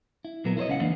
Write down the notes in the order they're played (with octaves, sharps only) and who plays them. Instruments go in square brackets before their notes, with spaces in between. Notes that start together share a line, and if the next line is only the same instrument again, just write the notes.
[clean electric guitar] E4
A#2 F#3 B3 A#4
E4 A#4 C5 C#5 D#5
C#2 C#4 F5 F#5
E3 A#3 D4